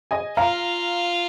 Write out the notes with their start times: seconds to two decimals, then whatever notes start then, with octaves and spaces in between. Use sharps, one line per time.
0.11 D#5 G#5
0.37 F4 F5 A#5